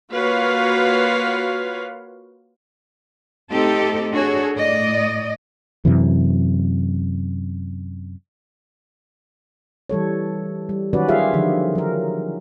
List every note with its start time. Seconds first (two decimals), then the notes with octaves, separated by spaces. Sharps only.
0.13 A#3 F4 F#4 B4 C#5 F5
3.52 A3 C4 D#4 G4 A4
4.12 D4 F#4 G#4 A4 C#5
4.57 A2 D5 D#5
5.85 F#2 C3 E3
9.90 E3 G3 A4 C#5
10.69 G3
10.93 D#3 F#3 C#4 F#4 B4 D5
11.08 F4 G4 G#4 E5 F5
11.33 D3 D#3 F3 F#3
11.75 F#3 A#4